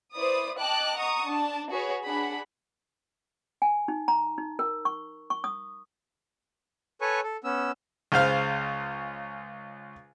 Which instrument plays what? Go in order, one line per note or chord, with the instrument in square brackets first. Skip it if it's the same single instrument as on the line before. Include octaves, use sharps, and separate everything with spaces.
[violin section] E4 B4 C5 D5 D#6
D#5 G5 A5 D6 F#6
F#5 A#5 C#6 D#6
D4 A5
F#4 G#4 B4 C#5
D4 G#4 F#5 B5
[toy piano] G#5
D#4
A#5
D#4
A#4
C#6
C#6
D#6
[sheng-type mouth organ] A4 B4 C#5 G#5 C#6
A4
B3 C#4 E6
[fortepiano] C#2 C#3 C5 F5 F6